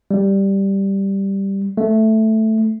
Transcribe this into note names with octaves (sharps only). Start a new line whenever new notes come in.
G3
A3